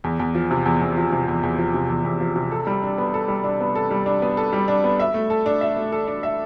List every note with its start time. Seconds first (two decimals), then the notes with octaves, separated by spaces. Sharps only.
0.04 E2
0.20 E2
0.35 F3
0.51 C3
0.66 E2
0.81 E2
0.97 F3
1.12 C3
1.28 E2
1.43 E2
1.58 F3
1.74 C3
1.89 E2
2.05 E2
2.20 F3
2.36 C3
2.51 A4
2.67 G3
2.83 D4
2.98 B3
3.14 A4
3.28 G3
3.44 D4
3.60 B3
3.75 A4
3.91 G3
4.06 D4
4.22 B3
4.37 A4
4.53 G3
4.68 D4
4.84 B3
4.99 E5
5.14 A3
5.30 A4
5.46 D4
5.61 E5
5.77 A3
5.92 A4
6.08 D4
6.23 E5